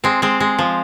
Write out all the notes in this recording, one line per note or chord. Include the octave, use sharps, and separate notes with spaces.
G#3 C4
G#3 C4
G#3
F3